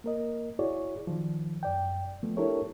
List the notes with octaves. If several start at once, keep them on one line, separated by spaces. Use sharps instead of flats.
A#3 A#4 D#5
E4 F#4 G#4 C#5 D5
D#3 F3
F#2 D5 G5
F3 A3 B3
D4 E4 G4 A4 A#4 C#5